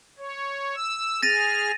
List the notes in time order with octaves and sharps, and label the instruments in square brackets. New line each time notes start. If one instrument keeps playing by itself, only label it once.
[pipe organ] C#5
E6
[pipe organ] G#4 F6 [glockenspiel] A6 A#6 D#7